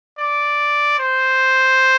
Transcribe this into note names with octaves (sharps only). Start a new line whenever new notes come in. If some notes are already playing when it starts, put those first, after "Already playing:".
D5
C5